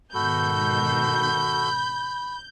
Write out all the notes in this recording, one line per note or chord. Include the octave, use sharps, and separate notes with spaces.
G#2 B2 D#3 F#4 A4 B5 G6